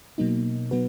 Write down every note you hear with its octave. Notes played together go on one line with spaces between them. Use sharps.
B2 F#3 A#3 D#4
B2 F#3 B3 F#4 B4